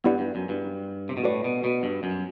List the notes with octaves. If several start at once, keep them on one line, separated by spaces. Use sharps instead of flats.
G2 B3 E4 G4 D5 F#5
G2
F#2
G2
C3
B2
A2 F#4 B4 D5
B2
B2
G2
F#2